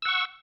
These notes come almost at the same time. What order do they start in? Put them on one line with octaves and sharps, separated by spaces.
E6 F#5 C#6